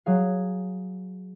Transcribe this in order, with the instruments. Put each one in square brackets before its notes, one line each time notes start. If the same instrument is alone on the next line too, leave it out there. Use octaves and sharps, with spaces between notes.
[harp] F#3 G#4 F5